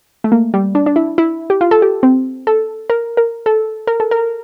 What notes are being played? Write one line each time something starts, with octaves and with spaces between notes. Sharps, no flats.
A3
A#3
G3
D4
D4
E4
E4
G4
F4
A4
G4
C4
A4
A#4
A#4
A4
A#4
A4
A#4